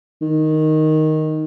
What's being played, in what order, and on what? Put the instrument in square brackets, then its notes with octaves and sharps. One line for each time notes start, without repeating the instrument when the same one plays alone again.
[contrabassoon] D#3